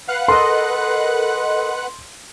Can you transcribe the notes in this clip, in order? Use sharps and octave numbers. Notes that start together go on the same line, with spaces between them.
B4 F5 F#5 F#6
A4 A#4 D#5 C6